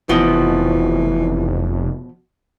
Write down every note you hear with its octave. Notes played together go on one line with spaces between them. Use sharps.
F1 B2 E3 F3